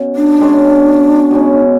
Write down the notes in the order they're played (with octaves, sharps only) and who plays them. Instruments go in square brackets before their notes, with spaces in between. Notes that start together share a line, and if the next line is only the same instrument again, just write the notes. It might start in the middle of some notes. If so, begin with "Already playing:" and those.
Already playing: [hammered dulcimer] B2 C#4
[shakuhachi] D4
[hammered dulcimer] B2 G#3 C#4
B2 G#3 C#4